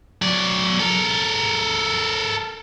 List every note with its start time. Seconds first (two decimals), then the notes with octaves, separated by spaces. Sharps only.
0.22 F#3 D5
0.80 A4 A#4